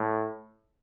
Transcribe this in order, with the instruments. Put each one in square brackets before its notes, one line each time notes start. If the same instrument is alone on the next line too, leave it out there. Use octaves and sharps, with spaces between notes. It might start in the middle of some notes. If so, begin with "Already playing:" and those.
Already playing: [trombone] A2